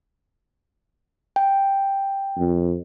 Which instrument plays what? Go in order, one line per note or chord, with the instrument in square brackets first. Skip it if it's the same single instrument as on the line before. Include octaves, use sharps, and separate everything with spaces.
[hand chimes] G5
[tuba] F2